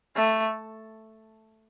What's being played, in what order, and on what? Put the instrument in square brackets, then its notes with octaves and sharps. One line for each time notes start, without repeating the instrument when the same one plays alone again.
[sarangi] A3